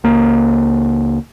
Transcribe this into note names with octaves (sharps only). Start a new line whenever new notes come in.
C#2 A#3